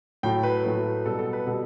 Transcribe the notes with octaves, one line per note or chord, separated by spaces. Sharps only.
A2 F#3 A3 G5
B4
A2 F#3 A3
B2 G3 A4
A4
B4
B2 G3 A4